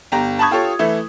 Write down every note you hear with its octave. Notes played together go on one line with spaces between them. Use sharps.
G1 G4 A#5
A5 B5 C#6 D#6 G#6
F4 G4 A4 C#5
E3 A3 E4